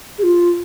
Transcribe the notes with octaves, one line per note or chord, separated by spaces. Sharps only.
G#4
F4